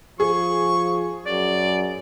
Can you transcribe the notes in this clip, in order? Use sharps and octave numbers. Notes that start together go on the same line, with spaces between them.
F3 G#4 C#6
F#2 D5